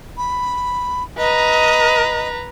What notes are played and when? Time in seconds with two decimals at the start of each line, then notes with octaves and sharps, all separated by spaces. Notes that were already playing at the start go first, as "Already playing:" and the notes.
0.17 B5
1.18 B4 D#5 A#5